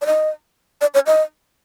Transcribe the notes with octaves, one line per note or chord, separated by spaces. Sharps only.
D5
D#5
D5
C#5
D#5